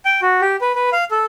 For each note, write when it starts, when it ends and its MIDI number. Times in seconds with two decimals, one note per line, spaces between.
0.05 0.21 79
0.22 0.41 66
0.41 0.56 67
0.61 0.72 71
0.75 0.90 71
0.93 1.04 77
1.11 1.26 69